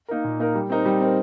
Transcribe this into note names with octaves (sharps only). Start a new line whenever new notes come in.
A#3 D#4 A#4
A#2
A#3 D#4 A#4
G3
C4 D#4 A#4
G3
C4 D#4 A#4